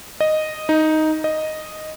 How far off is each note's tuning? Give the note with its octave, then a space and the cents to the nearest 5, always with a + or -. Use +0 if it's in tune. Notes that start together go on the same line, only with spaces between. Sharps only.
D#5 -5
D#4 +5
D#5 +0